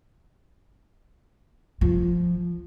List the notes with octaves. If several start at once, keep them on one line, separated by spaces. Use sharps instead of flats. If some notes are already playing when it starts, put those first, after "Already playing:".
F3